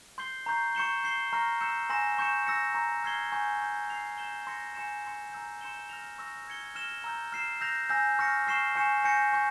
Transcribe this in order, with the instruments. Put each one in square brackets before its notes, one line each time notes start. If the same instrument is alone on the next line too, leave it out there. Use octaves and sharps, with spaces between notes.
[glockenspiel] C6 G6 C7 G7
A#5 C#6 G6 C7
C#6 G6 C#7 E7 G7
G6 C7 G7
A#5 C#6 F6 A#6
E6 G6 C#7 E7
G#5 C6 E6 A#6 E7
C#6 G6 C#7 E7
E6 A#6 C#7
A#5 C#6 G6
C#6 F6 G#6 C7 G7
G#5 C#6 G6
G#5 C#6 G6
E6 G6 C7 F7
G6 A#6 E7 G7
C6 E6 A#6 C#7
G#5 C6 G6 C#7 E7
C6 E6 G6 C#7
A#5 E6 G6
C6 G6 C#7 E7 G7
F6 A#6 F7
C#6 E6 A#6
F6 G#6 C#7 G7
F6 A#6 E7 G7
A#5 E6 G6
F6 C7 E7
E6 G6 A#6 F7
G#5 E6 G6 A#6
C#6 F6 A#6 C#7
C#6 F6 C7 E7 G7
G#5 C#6 G6 C#7 E7
G#5 C#6 G6 A#6 C#7
G#5 C#6 G6